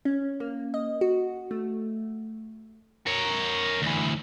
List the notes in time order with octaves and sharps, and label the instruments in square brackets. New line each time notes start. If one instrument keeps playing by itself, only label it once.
[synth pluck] C#4
A#3
D#5
F#4
A3
[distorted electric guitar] A#4 C#5
D2 E3